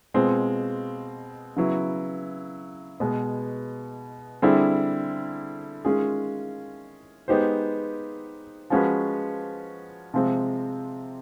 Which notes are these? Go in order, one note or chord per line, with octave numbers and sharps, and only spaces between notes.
B2 G#3 C4 F4
C#3 F#3 B3 E4
B2 G#3 B3
D3 G3 C4 E4 G#4
D#3 G#3 C#4 F4 G#4
G#3 B3 D#4 G4 C5
F3 G#3 C#4 F#4 B4
C3 F3 G#3 C4